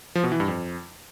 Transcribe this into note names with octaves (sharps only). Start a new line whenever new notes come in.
F3
B2
E3
G2
F2